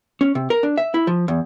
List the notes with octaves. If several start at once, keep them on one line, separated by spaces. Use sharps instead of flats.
C#4
C3
A#4
D4
E5
E4
F3
E2